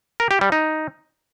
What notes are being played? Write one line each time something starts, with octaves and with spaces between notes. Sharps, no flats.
A#4
G4
G3
D#4